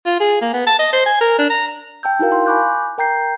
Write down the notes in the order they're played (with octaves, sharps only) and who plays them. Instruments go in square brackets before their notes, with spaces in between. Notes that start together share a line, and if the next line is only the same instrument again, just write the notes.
[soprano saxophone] F4
G#4
A#3
B3
A5
D#5
C5
G#5
A#4
D4
A#5
[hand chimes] G5 A5 E6 G6
D#4 E4 F#4 A#4 F5
F5 C6
G#5 B5 C#6 D6 F#6 G6
A#4 G5 A#5 G6 C7